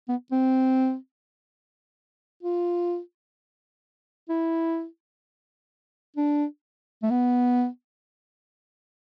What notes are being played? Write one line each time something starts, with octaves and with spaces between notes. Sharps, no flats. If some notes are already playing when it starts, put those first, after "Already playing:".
B3
C4
F4
E4
D4
A3
B3